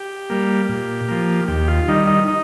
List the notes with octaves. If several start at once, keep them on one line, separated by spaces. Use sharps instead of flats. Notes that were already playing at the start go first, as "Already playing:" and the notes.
Already playing: G4
G3 A#3
A#2
F3 A#3
D#2 G4
F4
D#3 G3 D#4
D#4
D#4